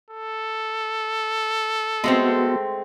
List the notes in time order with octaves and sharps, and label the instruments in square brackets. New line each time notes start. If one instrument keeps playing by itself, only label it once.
[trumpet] A4
[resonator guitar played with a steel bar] G#3 A3 C4 [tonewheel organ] B3 F#4